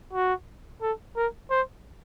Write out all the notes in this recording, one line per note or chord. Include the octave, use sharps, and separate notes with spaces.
F#4
A4
A#4
C5